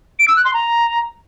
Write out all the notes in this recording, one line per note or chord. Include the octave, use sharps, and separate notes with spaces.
D7
E6
F#6
C6
A#5